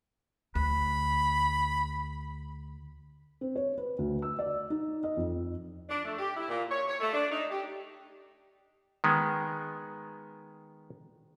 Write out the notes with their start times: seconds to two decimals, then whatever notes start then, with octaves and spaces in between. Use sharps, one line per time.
0.55 D2 B5
3.41 C4
3.56 C#5
3.78 B4
3.98 D2
4.22 E6
4.39 D5
4.70 D#4
5.04 D#5
5.17 F2
5.89 D4
6.05 A3
6.19 G4
6.37 E4
6.48 A#2
6.69 C#5
6.88 C#5
7.00 A3
7.12 D4
7.32 D#4
7.50 G4
9.04 D#3 G#3 B3